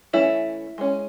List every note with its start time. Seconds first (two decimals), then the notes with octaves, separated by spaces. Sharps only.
0.13 E3 A3 C#4 E4
0.78 G#3 C#4